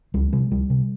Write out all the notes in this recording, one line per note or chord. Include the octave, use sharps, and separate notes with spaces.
C#2 G3
C3 G3
C#2 G3
C3